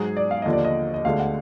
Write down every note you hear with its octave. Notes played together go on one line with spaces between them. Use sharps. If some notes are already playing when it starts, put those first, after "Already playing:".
Already playing: G#2 F#3 G#4
D5
F5
D#2 D3 F3 D#5
D5
D#5
D#5
D2 D3 G#3 F5
F#5